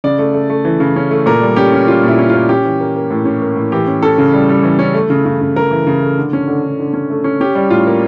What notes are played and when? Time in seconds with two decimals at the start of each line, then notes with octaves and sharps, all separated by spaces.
0.04 C#3 D5
0.19 A3
0.34 A3
0.50 A3
0.65 E3
0.80 C#3
0.96 C#4
1.11 A3
1.26 A#2 A#4
1.42 G3
1.56 C#4 G4
1.72 C#4
1.88 G3 F4
2.03 A#2
2.08 E4
2.19 C#4
2.29 F4
2.34 A#2
2.49 C#4 G4
2.65 E3
2.80 A#3
2.96 A#3
3.11 A2
3.25 C#4
3.42 A#3
3.56 A2
3.72 E3 G4
3.88 C#4
4.02 C#4 A4
4.18 C#3
4.34 G3
4.49 G3
4.63 E3
4.79 C#4
4.94 A3
5.10 C#3
5.26 C#3
5.41 C#3
5.56 C#3 A#4
5.71 E3
5.87 C#3
6.02 A3
6.18 D3
6.33 C#4
6.48 D3
6.63 D3
6.79 D3
6.94 C#4
7.10 A3
7.24 C#4
7.41 C#4 G4
7.55 G3
7.70 A2 F4
7.87 A#3